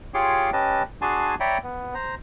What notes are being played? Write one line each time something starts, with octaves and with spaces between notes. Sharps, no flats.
F4 G4 G#4 C#5 C6 D6
C#4 G4 B4 D#5 A5
D4 F#4 G#4 G#5 A5 C6
C#5 D5 E5 G5 A#5 B5
B3
C5 A#5